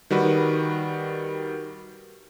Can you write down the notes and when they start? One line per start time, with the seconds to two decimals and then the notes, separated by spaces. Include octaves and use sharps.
0.10 D#3 G3 F#4 B4